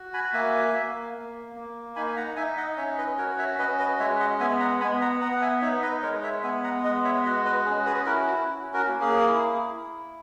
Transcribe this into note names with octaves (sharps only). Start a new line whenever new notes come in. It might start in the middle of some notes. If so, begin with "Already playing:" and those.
Already playing: F#4
G#5 B5
A#3 E5 G#5
A#3
A#3
A#3
D#4 G#5 B5
G#5
F#5 A#5
D#4 E5 G#5
D#5 F#5
C#4 C#5 E5
B4 D#5
F#4 A#4 C#5
C#5 E5
C#4 B4 D#5
B4 D#5
G#3 C#5 E5
D#5 F#5
B3 E5 G#5
F#5 A#5
B3 G#5 B5
F#5 A#5
B3 F#5 A#5
F#5
E5 G#5
D#4 C#5 E5
B4 D#5
G#3 A#4 C#5
C#5 E5
B3 E5 G#5
F#5 A#5
G#3 D#5 F#5
C#5 E5
F#4 D#5 F#5
B4 D#5
C#4 G#4
G#4 B4
E4 F#4 A#4
F#4
C#4
F#4 A#4
A#3
G#4
E4
E4